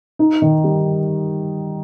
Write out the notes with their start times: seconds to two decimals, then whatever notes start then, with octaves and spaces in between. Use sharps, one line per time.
0.19 D#4
0.42 D#3
0.64 G3